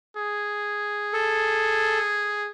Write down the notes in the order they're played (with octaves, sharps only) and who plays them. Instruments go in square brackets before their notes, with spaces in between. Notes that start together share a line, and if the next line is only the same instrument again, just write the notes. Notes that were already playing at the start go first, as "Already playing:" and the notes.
[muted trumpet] G#4
[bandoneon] A4